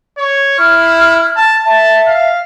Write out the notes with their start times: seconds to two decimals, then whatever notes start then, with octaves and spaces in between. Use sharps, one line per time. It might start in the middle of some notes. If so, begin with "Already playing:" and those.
0.18 C#5
0.59 E4 F6
1.36 A5
1.66 E5 A5
2.07 F5